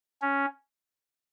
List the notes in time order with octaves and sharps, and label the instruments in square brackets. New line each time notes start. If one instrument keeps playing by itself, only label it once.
[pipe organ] C#4